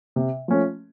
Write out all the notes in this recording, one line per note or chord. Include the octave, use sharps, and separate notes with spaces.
C3
F3 A3 C#4